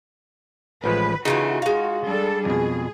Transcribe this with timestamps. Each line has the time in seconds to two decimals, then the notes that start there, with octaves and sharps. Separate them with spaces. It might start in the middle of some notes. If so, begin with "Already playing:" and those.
0.84 A1 F3 G#3 B4
1.25 C#3 E3 A3 D#4 F4 F#4
1.62 G#3 F5
2.05 G3 D4 A4
2.45 F2 B2 G#4